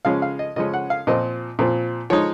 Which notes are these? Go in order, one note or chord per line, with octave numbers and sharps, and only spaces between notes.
C#3 F3 G#3 C#4 F5
F5
D#5
C#3 F3 G#3 C#4 D#5
F#5
F5
A#2 F3 C4 D#5
A#2 F3 C4
F3 G#3 D#4 C#5